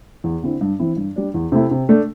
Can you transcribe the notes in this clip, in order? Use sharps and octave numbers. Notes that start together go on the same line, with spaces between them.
E2
D3 C4 E4
G2
E3 C4 E4
G2
G3 D4
E2
C3 A3 E4
C3
A3 D4